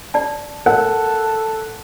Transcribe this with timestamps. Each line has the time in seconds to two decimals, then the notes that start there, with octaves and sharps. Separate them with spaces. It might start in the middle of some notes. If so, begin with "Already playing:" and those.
0.14 D5 A5
0.66 A4 A#4 F#5